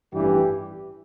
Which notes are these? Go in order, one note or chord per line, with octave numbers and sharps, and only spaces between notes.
A1 G2 E3 G4